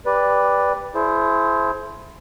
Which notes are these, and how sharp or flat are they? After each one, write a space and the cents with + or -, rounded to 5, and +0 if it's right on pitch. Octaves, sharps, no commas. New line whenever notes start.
G4 +15 B4 +0 D5 +0
E4 +15 G#4 +45 C5 +0